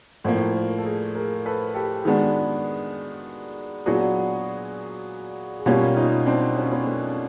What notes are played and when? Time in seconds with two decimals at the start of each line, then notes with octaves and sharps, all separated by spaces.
0.24 A2 F3 A#3 C5 D5
0.54 A#4 C5
0.78 A4
0.84 G#4 A#4
1.15 G#4 A#4
1.46 A4 B4
1.75 G4 A4
2.05 D#3 G#3 B3 D4 F#4 G#4
3.86 A#2 F#3 B3 D4 F#4 G#4
5.59 G#4
5.66 B2 G3 A#3 C#4 F4 G4
5.96 D#4 F4
6.26 C4 D4
6.57 C#4
6.65 C4
6.72 B3 C#4
6.86 A3 B3